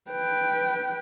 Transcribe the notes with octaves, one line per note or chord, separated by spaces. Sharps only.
B4 G5